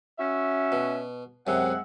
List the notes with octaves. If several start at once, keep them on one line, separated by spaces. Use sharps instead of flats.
C#4 F#4 E5
B2
F#2 C3 G#3 E5 F#5